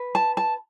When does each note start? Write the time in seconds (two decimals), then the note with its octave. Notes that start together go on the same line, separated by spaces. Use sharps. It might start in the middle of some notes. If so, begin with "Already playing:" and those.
Already playing: B4
0.15 A5
0.37 A5